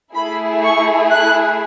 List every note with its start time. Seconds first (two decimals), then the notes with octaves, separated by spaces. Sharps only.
0.14 A3 E4 G#4 B5
0.63 C#6
1.12 F#6